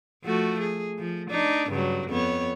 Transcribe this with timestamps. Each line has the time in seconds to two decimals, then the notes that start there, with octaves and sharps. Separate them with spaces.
0.24 F3 A3 F#4
0.60 G#4
0.99 F3
1.30 D4 D#4
1.70 G2 C#3 F#3
2.09 F2 B3 C#5